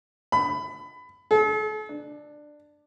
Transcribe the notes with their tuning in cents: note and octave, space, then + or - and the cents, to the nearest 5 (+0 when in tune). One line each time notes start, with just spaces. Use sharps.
B5 +20
A4 -45
D4 +15